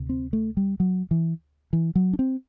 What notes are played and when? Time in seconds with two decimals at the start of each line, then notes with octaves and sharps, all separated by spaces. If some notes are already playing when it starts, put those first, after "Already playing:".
Already playing: D2 C3
0.09 C4
0.33 A3
0.57 G3
0.80 F#3
1.11 E3
1.73 E3
1.95 F#3
2.13 D4
2.19 C4